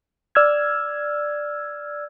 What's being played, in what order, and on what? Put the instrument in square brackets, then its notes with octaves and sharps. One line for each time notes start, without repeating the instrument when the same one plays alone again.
[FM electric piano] D5 E6 F6 G#6